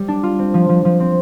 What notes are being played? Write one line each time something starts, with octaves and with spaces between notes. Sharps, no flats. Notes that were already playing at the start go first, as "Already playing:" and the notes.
Already playing: G3
D4
F4
C4
F3
F3
F3
C4